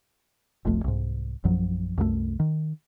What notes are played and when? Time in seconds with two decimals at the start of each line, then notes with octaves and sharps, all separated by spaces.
0.65 F1 B1 F2 A3
0.84 C2 G#2
1.44 A#1 F#2 F3 F#3
1.98 C2 F#2 F#3 A3
2.40 D#3